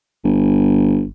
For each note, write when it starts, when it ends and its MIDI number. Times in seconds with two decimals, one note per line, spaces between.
0.24 1.06 31